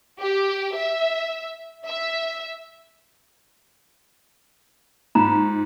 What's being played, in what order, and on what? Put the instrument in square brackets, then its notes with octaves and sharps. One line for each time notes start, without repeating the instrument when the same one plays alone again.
[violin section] G4
E5
E5
[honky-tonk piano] G#2 [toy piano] F4 A#5